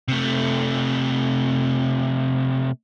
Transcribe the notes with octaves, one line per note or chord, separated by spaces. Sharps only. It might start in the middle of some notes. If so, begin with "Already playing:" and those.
C3 A3